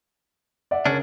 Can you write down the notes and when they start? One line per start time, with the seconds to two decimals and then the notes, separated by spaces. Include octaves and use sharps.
0.71 D5 E5 F#5
0.86 C#3 C#4 D4 A#4